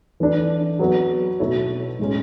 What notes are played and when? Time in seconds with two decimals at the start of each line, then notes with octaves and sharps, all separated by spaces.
0.20 E3 A3 D4
0.79 F#3 B3 F#4
1.39 B2 A3 E4 A4 C#5
1.99 A2 G#3 C#4